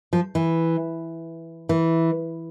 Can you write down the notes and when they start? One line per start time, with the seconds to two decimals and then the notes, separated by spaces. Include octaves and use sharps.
0.13 F3
0.35 E3
1.69 E3